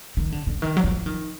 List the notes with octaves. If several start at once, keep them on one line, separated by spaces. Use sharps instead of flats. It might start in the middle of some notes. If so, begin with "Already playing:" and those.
D#3
D3
D3
D#3
F#3
F3
D#3